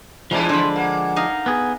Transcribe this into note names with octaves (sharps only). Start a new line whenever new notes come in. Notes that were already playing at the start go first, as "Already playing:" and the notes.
E2 A#2 F3 G#3 D4 E4
D3 B5 C6
A#3 F#5
D#4 D#5 F5
B3 G#4